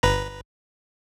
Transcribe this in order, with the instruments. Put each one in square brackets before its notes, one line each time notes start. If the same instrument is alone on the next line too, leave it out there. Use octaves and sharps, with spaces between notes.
[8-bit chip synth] G1 B4 A#5